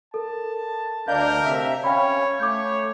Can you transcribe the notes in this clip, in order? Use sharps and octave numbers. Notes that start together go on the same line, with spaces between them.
A4 A#4 A5
D2 D4 A#4 D#5 F5 G6
C3 E5
C#4 C#5 F5 G5 B5
A3 C#5 D6 G6